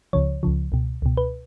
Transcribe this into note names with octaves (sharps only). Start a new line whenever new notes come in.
C#2 C#3 F3 C#5
C#2 C#3 F3
C#2 B2
C#2 B2
B4